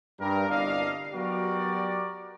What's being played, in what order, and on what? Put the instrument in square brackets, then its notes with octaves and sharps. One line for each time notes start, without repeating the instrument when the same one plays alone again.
[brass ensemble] G2 A#4
G1 C2 D4 D5 D#5 F5
F#3 B3 F#4 G4 A#4 D5